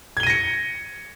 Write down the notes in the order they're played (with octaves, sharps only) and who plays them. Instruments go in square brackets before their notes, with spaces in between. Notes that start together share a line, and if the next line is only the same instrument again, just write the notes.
[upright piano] G#6
G7
D#7
A#6
C#7